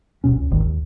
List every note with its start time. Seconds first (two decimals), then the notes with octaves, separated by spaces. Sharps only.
0.24 D#1 C#2 B2 C#4
0.37 C#2
0.50 D#1 G#1 G#2 D#3
0.64 D#2